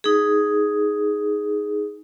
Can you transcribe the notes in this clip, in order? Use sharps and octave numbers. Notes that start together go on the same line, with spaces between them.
D#4 G#4